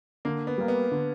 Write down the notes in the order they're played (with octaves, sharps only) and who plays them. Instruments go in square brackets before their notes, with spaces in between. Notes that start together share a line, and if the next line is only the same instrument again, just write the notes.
[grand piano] D3 [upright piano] A#3
[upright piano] B3
[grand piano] G3 A#3
[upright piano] B3
[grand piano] D3